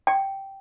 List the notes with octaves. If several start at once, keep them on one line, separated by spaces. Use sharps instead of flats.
G5